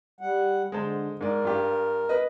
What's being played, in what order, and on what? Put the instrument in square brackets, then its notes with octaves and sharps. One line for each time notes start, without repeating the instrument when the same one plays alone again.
[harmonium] G3 F#5
[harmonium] D3 [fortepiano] G#3 C5 A5
[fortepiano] G#2 D5 [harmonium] A#4
[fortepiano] G2 F4 G4
B4 D#5